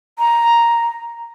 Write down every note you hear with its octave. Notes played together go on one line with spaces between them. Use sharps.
A#5